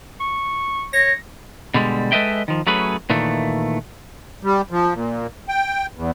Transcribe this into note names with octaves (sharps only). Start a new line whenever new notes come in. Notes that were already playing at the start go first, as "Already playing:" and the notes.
C#6
C#5 A#6
B2 D3 G3 G#3
G#3 A4 B4 D#5 E5 G5
D#3 F3
F#3 A3 C#4 G#4 B4
A#2 D#3 E3 A3
G3
F3
A#2
G5
E2